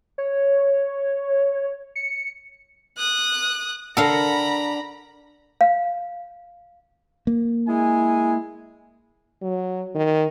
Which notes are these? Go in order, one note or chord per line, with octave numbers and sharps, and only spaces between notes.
C#5
C#7
D#6 F#6
D4 A4 A#4 F5 F#5 A#5 B5
F5
A#3
G#3 E4 G#5
F#3
D#3